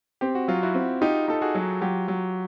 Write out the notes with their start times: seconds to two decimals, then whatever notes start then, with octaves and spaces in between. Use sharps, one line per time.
0.21 C4 G4
0.35 F#4
0.48 F#3 F4
0.63 E4 F#4
0.75 C4
1.01 D#4 F4 G4
1.28 D#4 A4
1.42 F#4 G#4
1.55 F#3
1.81 F#3 F4 G4
2.08 F#3